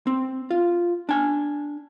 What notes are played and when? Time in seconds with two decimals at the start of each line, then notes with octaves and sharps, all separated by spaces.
0.07 C4
0.50 F4
1.09 D4 G#5